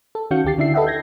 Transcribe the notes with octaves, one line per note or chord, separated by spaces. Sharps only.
A4
D#3 C#4 F#4 F5 G6 C#7
D2 D#3 G4 A6 C7
D3 D4 E4 E5 C7
A4 B4 D#5 E5 F#5 G5
G6 G#6 A#6